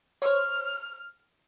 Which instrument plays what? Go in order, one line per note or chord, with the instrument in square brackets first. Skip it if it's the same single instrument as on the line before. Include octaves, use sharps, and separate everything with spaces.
[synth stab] C5 C#5 [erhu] F6